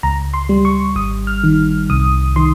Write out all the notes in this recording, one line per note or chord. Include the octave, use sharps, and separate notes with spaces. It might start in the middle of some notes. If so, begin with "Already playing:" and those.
C#2 A#5
C6
G3
C#6
G#1 D#6
F6
D#3
C2 D#6
D#3 C6